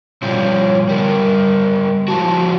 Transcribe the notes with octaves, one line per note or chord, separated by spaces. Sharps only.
B2 F3 G3 C#5
G3 B3 A#4
F3 G#3 F#4 A5